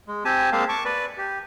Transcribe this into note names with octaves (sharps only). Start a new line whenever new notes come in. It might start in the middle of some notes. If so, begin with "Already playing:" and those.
G#3
C4 G4 G#5 A5
G#3 A#3 C4 F5 A5
A5 C#6 D6
B4 D5
G4